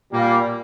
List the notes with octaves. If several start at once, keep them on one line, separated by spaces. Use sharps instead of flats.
A#2 G3 A#3